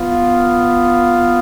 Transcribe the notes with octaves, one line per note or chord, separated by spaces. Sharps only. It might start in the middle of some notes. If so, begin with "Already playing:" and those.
Already playing: B3 F4